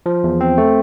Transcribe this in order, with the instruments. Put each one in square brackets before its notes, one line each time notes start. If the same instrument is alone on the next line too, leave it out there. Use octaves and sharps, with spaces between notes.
[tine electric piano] F3
E2
C4
A3